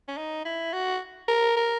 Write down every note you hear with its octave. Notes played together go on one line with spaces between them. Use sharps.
C#4
D#4
E4
F#4
A#4
A#4